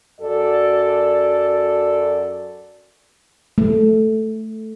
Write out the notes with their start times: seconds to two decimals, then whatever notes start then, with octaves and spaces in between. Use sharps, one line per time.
0.20 F#2 F#4 A4 D5
3.58 A3